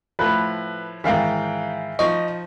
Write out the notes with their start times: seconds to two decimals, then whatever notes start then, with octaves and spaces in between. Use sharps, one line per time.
0.19 A2 F3 B4
1.04 G#2 D#3 E3 E5 F5 G5
1.99 F3 D#4 D#5 C#6